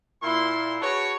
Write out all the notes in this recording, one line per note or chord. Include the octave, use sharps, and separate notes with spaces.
A#2 E4 C6
D4 F#4 G#4 B4 C#5